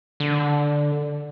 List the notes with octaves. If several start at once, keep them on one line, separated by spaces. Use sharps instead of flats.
D3